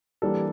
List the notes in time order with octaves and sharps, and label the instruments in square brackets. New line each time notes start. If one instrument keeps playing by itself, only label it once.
[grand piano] E3 A#3 D4 A4 [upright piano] G3